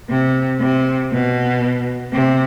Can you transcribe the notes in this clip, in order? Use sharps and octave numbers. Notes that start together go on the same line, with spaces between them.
C3
C3
B2
C3